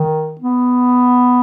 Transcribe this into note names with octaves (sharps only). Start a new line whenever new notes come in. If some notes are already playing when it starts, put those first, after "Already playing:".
Already playing: D#3
B3